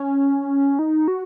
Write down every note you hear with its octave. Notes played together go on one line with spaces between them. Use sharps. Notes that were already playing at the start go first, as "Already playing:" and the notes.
Already playing: C#4
D#4
F#4